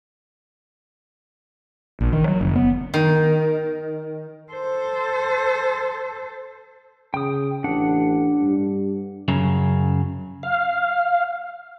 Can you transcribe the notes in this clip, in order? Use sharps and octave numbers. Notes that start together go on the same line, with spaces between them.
A#1
D#3
F#3
F#1
B3
D#3
A4 C5
C#3 G5 D#6
A1 D4 F#5
G2
F#2 C#3 F#3
F5